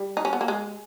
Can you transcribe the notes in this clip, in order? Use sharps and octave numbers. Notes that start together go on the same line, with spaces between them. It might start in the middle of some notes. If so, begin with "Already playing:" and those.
Already playing: G3
D#4
C#4
B3
A#3
G#3